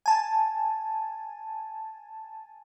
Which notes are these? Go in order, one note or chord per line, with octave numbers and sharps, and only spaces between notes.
G#5 A5